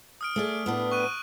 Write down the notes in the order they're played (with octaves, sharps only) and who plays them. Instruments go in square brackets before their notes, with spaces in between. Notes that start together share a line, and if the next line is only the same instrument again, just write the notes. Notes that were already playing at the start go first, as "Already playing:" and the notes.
[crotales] D#6 F6 D7
[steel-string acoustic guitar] A3 G#4 D5
A2 B3 D4
[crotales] C#6 F#6 D#7